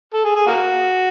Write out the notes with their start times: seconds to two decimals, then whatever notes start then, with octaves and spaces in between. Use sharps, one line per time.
0.13 A4
0.25 G#4
0.35 G#4
0.47 A#3 F#4